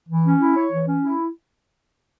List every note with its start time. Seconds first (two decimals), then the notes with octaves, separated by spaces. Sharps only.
0.09 E3
0.25 C#4
0.41 E4
0.56 C#5
0.73 E3
0.87 C#4
1.03 E4